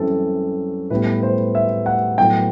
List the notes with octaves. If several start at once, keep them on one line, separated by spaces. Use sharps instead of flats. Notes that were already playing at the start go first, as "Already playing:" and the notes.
Already playing: F#2 E3 G3 C4 A4
A2 G3 B3 B4
C5
E5
F#5
A2 F#3 B3 G5